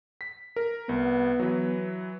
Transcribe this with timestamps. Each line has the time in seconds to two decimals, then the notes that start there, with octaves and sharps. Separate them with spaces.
0.21 B6
0.56 A#4
0.89 C2 B3
1.39 E3 F#3